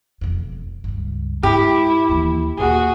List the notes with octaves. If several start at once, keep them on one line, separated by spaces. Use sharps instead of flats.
E1 F2
C#2 G2
G#2 E4 G4
D#2 E3
D#2 A#2 F#4 G#4